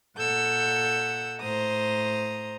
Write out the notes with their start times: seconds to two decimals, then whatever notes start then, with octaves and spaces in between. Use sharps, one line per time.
0.18 A#2 A4 F#5 E6 G6
1.41 A2 C5 A#5 D#6